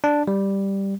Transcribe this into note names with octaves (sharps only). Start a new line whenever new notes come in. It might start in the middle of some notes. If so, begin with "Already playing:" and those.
D4
G3